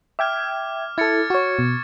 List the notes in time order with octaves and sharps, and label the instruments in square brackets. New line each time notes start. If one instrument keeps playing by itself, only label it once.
[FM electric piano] E5 G5 G#6 [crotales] D6 F6
[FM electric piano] E4 A4 [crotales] G#6 A6 C#7
[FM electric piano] F#4 C#5 [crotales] C#6
[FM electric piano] B2